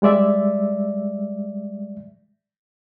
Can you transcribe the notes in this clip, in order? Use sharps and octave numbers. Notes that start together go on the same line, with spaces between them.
G3 G#3 D5 E5